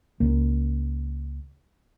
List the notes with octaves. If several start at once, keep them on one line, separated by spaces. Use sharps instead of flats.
C#2 A#3